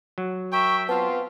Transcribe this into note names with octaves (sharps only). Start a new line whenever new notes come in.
F#3
A#4 E5 G5 C#6
B3 C4 F4 A5